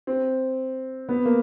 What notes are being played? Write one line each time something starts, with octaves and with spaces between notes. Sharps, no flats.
C4
B3
A#3